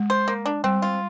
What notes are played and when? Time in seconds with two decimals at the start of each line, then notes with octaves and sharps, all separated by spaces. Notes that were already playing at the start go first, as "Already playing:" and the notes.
Already playing: G#3
0.10 C5
0.28 A#3
0.46 D4
0.64 G3 C4
0.82 F4